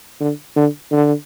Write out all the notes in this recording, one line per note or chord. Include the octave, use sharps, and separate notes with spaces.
D3
D3
D3